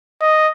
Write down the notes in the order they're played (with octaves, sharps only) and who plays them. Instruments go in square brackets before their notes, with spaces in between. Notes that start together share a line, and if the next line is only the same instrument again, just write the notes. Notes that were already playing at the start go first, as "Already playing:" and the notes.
[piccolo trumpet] D#5